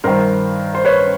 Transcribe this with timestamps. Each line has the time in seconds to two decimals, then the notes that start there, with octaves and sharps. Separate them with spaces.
0.04 G2 D#3 A#4 C5
0.75 C5
0.85 B4 C#5